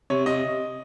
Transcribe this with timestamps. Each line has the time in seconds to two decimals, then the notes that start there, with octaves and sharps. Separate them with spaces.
0.10 C3 C#5
0.26 C3 D#5